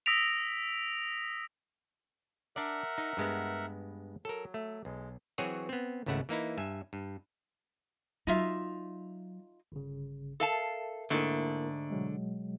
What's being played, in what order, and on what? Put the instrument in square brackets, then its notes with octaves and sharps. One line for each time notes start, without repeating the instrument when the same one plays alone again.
[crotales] D#6 E6 A#6 B6 D7 F7
[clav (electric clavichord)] D4 D5 [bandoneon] A#4 E5 F#5
[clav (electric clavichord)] D#4
G2 G#3 B3
[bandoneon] F#3 [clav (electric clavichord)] A4 A#4
[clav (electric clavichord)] A3
[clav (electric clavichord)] B1 [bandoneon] G#3
[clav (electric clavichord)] E3 F#3 C4 F#4 G#4 C#5
B3 C4
G#1 C#2 C#3 A3 E4 F#5
E3 A#3 D#4 E4
G2 E5 G#5
G2
[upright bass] F#3 [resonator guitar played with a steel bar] D#4 F4 E5
[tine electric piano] G1 C#3
[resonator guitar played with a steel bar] A4 F5 A5 [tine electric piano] A#4 E5
[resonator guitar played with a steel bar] G#2 A3 [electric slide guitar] D3 [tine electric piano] A#3 E4 A#4
[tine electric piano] B2 F#3 G#3